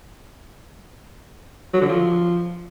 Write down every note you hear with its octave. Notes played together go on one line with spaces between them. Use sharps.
F#3
D3
F3